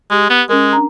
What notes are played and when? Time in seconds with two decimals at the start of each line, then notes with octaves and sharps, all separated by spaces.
0.11 G#3 G4
0.30 B3
0.49 G#3 C#4 A#4
0.73 D4 A#5